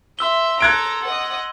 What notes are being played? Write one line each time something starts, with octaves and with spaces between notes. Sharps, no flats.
E5 C6 E6 G7
A4 A#5 F#6 G#6 D7
D#5 F#5